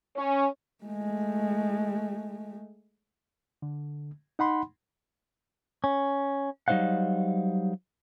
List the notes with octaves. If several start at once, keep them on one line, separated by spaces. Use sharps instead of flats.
C#4
G#3 A3
D3
D#4 F#5 B5 C6
C#4
F#3 G3 D#4 C5 F5 F#5